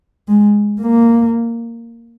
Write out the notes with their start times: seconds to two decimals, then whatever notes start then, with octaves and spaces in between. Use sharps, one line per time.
0.28 G#3
0.80 A#3